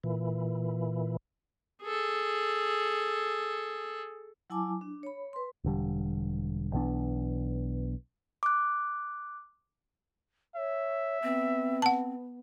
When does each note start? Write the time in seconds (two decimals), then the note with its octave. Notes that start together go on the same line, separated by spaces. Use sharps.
0.04 A#2 E3
1.83 G#4 A4
4.50 F#3 E4 G#5 A5 D6
4.81 D4
5.03 C#5 B5
5.33 B4 C6
5.64 E1 D3 G3
6.73 B1 E3 B3 D4
8.43 D6 F#6
10.56 C#5 E5
11.23 B3 C4
11.82 F#5 A5